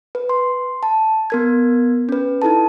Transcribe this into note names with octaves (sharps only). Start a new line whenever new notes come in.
B4
C6
A5
B3 A#4 G#6
C#4 B4
D#4 E4 A4 A5